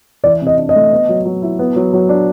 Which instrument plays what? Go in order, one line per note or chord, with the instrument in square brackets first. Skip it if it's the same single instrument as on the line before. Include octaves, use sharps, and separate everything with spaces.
[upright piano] E3 [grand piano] D5
[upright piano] C3 [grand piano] D#5
[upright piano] D4
[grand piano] D#5
[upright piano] A3
B3
F#3
F#3
E4
B3
F#3
F#3
D4